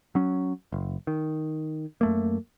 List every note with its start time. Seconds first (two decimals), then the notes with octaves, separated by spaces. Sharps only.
0.15 F#3 C#4
0.72 F#1
1.07 D#3
2.01 F#2 A3 A#3